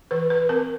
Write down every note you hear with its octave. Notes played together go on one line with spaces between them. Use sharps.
E3 B4
B4
C4 A#4